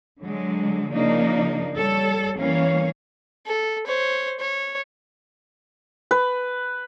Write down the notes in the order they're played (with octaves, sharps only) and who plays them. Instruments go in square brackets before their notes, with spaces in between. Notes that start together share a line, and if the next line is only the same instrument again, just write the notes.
[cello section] D3 F#3 G#3
C#3 F3 A#3 D4 D#4
G3 A4 C#5
E3 G3 A#3 C#4 C#5 F5
[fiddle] A4
C5 C#5
C#5
[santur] B4